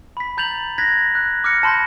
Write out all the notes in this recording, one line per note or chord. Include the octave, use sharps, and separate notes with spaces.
B5 B6
A#5 G6 A6 F7 F#7
F#6 G#6 A#6 B6
F#6
D6 F6 F#6 A#6 C#7
A5 B5 C6 F6 G6 A#6